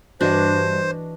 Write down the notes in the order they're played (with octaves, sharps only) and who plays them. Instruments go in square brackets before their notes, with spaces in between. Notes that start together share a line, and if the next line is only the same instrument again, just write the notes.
[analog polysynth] G2 [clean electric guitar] E3 B4 D#5 [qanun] D4 F#4 [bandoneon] C5